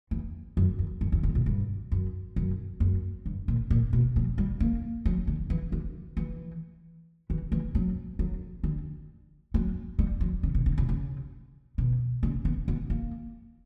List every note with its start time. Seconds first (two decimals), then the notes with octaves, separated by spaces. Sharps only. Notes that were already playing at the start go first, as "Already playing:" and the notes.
0.11 E2
0.57 F#2
0.79 E2
1.01 F#2
1.12 E2
1.23 F#2
1.35 A#2
1.46 G2
1.92 F#2
2.36 F#2
2.80 F#2
3.26 G2
3.48 A#2
3.70 A#2
3.93 B2
4.16 F#3
4.38 G3
4.60 A#3
5.06 F#3
5.27 D3
5.50 E3
5.72 D3
6.17 E3
7.30 E3
7.52 E3
7.75 F#3
8.19 F#3
8.64 D3
9.54 F#3
9.99 G3
10.21 F#3
10.43 C#3
10.54 B2
10.66 C#3
10.78 C#3
10.89 C#3
11.78 B2
12.23 C#3
12.45 B3
12.68 B3
12.90 A#3